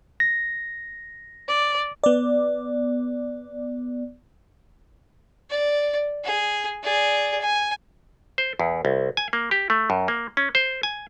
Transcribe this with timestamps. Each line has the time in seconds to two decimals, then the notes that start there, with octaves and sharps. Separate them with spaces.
0.20 A#6
1.47 D5
2.04 B3 D5
5.50 D5
6.24 G#4
6.83 G#4 D5
7.41 G#5
8.38 C5
8.60 E2
8.85 C2
9.17 G#5
9.33 A#3
9.51 G4
9.70 A3
9.90 F#2
10.08 A#3
10.37 C#4
10.55 C5
10.83 G#5